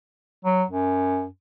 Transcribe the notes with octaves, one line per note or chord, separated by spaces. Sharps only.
F#3
F#2